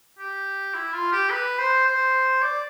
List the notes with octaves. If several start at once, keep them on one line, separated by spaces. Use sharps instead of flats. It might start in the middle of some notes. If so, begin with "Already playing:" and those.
G4
E4
F4
G4
B4
C5
C5
D5